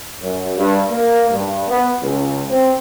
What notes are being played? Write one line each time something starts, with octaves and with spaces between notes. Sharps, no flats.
F#2
G2
A#3
G2
B3
C#2
C4